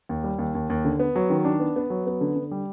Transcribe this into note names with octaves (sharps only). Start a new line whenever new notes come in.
D#2
G3
D#2
D#2
D#2
D3
B3
F#3
D#3
D4
B3
B3
F#3
B3
D3
D3
G3